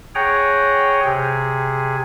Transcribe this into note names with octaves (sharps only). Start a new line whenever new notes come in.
G#4 C#5 F#5 G5 A#5
C3 G#4